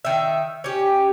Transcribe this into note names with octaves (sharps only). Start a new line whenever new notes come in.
D#3 E5
C#4 G4